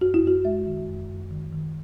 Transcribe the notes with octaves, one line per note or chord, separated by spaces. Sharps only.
F#2 F#4
E4
F#2 F#4
G#3 E5
D#3
F#2
F#2
D#3
D#3